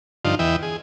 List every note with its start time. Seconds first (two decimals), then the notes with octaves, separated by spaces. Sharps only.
0.25 G2 D3 F3 D#4 F4
0.39 E2 E3 D#5 E5 G5
0.62 G#4